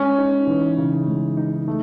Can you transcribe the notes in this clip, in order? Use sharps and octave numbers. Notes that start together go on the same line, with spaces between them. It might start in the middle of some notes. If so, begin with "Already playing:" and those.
Already playing: G#3 C#4
D#4
E3
C#3
G#3
D#4
A3